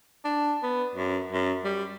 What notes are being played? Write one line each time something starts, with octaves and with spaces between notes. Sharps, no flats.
D4
B3
F#2
F#2
G3